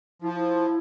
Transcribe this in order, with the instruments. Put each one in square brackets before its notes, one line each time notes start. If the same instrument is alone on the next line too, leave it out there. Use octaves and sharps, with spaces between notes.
[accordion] F3 [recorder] E4
[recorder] F4
E4